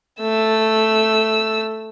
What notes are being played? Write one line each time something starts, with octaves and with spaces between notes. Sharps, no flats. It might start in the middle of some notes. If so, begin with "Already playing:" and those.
A3 E6